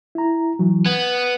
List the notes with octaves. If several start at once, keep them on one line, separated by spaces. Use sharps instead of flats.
E4 A#5
E3 F#3
B3 G#6